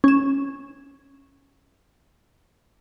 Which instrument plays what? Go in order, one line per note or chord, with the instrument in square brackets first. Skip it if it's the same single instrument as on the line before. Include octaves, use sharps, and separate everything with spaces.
[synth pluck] C#4 E7